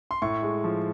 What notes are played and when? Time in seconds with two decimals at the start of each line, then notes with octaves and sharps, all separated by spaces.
0.11 C6
0.22 A2 C#6
0.42 G#3
0.64 F3